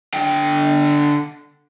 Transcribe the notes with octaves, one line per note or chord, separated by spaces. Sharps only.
D3 G5